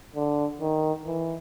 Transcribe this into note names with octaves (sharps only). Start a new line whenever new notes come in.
D3
D#3
E3